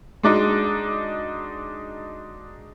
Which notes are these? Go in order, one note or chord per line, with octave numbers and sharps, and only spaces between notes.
G#3 D4 D#4 F#4